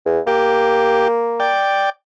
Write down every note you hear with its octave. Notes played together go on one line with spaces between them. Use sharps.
E2
A#3 G4
D5 G5